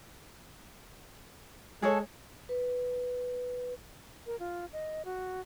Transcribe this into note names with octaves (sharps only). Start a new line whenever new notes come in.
G#3 G#4 A4 C#5
B4
A#4
F4
D#5
F#4